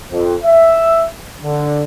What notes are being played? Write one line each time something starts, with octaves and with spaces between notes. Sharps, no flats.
F2
E5
D3